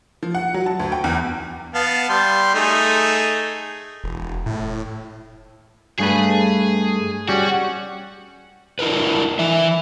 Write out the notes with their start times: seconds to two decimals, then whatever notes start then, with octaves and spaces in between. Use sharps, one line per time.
0.23 F3
0.35 F#5
0.54 F#3
0.66 A5
0.79 D2
0.92 G5
1.04 E2
1.74 B3 F5 A5
2.09 G3 C6
2.55 A3 D#4 G#4
4.04 E1
4.46 A2
6.00 G2 A3 G#4 B4
7.29 G3 C#4 F#4
8.79 D4 E4 A#4 B4
9.39 E3 E5